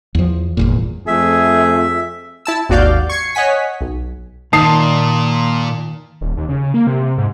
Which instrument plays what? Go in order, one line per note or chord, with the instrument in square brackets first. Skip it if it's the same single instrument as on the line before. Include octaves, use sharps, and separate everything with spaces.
[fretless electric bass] E2 F3
G1 E2 A#2
[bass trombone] F2 [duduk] A3 [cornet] G#4 [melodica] E5
[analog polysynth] E4 A5 E6
G#1 D#2 F#4 D5 F5 G6
C#6 G#6 C7 C#7
C#5 D#5 F#5 G#5 B6
B1
[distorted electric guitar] A#2 [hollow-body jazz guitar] D#3 [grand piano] A5 D#6 C7
[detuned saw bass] D#1
D#2
C#3
A#3
C3
G#2